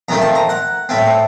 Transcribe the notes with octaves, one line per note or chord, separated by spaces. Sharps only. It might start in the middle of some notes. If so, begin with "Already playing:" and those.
F2 D#3 A3 C4 A#5
A5
A#5
F#5
A2 A3 C4